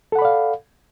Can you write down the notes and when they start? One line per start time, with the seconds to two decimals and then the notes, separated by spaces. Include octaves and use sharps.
0.12 A4
0.15 F#5
0.19 B5
0.22 D5
0.25 F5